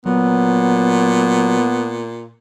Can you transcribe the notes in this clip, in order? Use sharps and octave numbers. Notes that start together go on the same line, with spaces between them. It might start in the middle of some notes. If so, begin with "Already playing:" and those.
A#2 F#3 B3